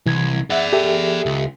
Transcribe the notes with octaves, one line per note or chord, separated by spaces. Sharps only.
C2 E3 G#6
G#4 D5 E5 F#5
G4 A4 E5
C#2